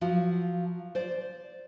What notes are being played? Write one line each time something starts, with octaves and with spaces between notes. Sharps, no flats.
F3 F#3 F#4
C5 D5